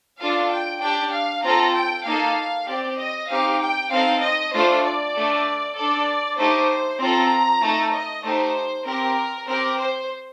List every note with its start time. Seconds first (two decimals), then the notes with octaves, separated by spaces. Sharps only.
0.19 D4 F4 A4 F5
0.50 G5
0.81 D4 G4 G5
1.13 F5
1.43 C4 F4 A4 A#5
1.75 G5
2.06 A#3 D#4 A4 F5
2.67 C4 G4 D5
2.98 D#5
3.29 C4 D#4 G4 F5
3.60 G5
3.91 C4 D#4 A4 F5
4.22 D#5
4.53 A3 D4 F4 A4 C5
4.84 D5
5.15 A3 D4 A4
5.76 D4 A4 D5
6.38 A3 D#4 G4 C5
7.00 C4 F4 A4 A#5
7.62 A3 D#4 A4
7.93 D#5
8.24 A3 D#4 G4 C5
8.85 C4 G4 A#4
9.48 C4 G4 A#4
9.79 C5